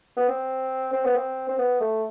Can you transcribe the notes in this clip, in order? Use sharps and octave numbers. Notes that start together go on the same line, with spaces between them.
B3
C4
C4
B3
C4
C4
B3
A3